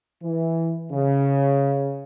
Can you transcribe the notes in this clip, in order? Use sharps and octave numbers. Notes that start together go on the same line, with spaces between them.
E3
C#3